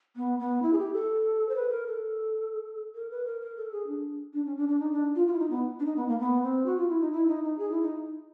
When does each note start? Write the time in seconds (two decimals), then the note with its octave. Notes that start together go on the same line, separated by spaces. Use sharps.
0.16 B3
0.39 B3
0.62 E4
0.73 G#4
0.78 G4
0.93 A4
1.49 C5
1.56 B4
1.71 A#4
1.87 A4
2.95 A#4
3.11 B4
3.26 A#4
3.41 A#4
3.57 A4
3.72 G#4
3.87 D4
4.34 D4
4.45 C#4
4.57 D4
4.68 D4
4.80 D#4
4.92 D4
5.15 F4
5.27 F4
5.33 E4
5.39 D#4
5.50 B3
5.80 D4
5.85 D#4
5.96 B3
6.08 A#3
6.19 B3
6.43 C4
6.66 F#4
6.78 F4
6.89 E4
7.01 D#4
7.12 E4
7.28 D#4
7.44 D#4
7.58 G#4
7.71 E4
7.82 D#4